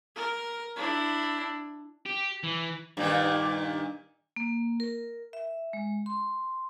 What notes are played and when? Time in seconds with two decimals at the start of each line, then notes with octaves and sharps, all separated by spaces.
0.16 A#4
0.76 D4 E4
2.06 G4
2.44 E3
2.97 G2 A#2 D#3
4.36 A#3
4.80 A#4
5.33 E5
5.73 G#3
6.06 C6